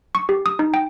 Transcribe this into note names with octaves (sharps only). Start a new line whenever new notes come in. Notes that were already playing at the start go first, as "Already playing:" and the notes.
C#6
G4
D#6
D#4
G5